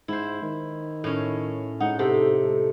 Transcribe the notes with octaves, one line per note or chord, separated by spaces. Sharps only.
G#2 E4 C5
D#3
A2 C#4
G#2 D#4 F#5
C3 A4